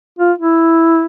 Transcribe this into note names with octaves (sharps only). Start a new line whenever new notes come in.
F4
E4